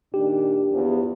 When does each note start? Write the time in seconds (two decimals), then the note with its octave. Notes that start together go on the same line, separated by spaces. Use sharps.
0.14 A#2 D#3 D4 G4
0.73 E2 F3